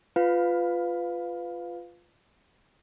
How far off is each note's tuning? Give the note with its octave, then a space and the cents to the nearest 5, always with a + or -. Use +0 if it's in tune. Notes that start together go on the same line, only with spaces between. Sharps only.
F4 +0 B4 +20 F5 +10